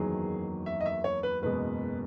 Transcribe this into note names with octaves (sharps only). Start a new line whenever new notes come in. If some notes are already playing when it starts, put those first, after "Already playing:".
Already playing: F#1 E2 D#3 F#3 G#4
E5
D#5
E5
C#5
B4
F#1 E2 B2 G#3 B4